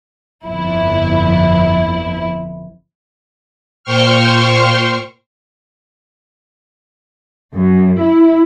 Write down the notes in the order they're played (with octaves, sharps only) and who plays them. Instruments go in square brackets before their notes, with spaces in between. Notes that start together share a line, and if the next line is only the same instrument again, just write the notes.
[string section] G1 F2 E4
[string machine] A#2 C5 G5 C6 C#6 F6
[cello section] F#2
E4